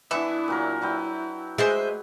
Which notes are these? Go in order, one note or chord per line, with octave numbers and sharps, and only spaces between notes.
E3 B3 D4 E4 E5 C#6
A#2 F#3 A#4
F#3 E4 B4 G5
G#3 G#4 C5 D#5 E5